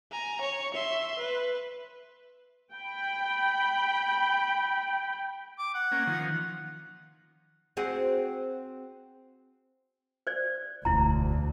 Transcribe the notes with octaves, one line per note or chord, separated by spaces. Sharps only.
G#5 A#5
C#5
E5 C6
B4
G5 B5
D6
F#5
A#3 C#4
D#3 F3
C4 F#4 G#4
C5 D5
E1 D2 E4 A#5